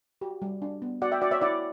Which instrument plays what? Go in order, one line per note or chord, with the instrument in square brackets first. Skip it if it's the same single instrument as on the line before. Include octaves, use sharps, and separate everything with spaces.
[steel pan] F#4 G4
G3
D4
B3
F#4 D5 F#5
E5 G5
F#4 D5 F#5
C#5 E5
E4 D5 F#5